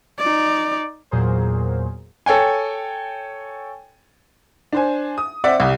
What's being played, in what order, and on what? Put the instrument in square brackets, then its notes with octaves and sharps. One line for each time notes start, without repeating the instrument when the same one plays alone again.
[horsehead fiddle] D#4 D5
[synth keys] E2 A#2 F#3 G#4 A#4 C5
[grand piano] A4 C#5 G5 G#5
[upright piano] D4 C5 G#5
D#6
C4 D5 E5 F#5
C2 G3